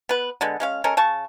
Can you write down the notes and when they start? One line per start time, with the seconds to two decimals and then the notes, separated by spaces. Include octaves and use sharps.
0.09 B3 B4
0.41 D3 G#3 B3
0.60 G#3 C#4 F5
0.84 G#3 C#4 A4 A#4
0.97 C#3 A5 C#6